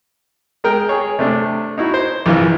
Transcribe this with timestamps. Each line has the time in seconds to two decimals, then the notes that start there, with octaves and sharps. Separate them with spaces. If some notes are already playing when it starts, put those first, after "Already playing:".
0.64 G#3 A#4 G5
0.89 G#4 C#5
1.19 C3 A3 D4
1.78 D#4 E4 F#4
1.94 C5
2.26 A#1 C3 E3 E4 F4